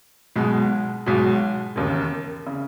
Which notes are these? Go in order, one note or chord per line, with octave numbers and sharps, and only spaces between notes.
B1 B2 G#3
B1 B2 G#3
E1 D#2 C#3
C#3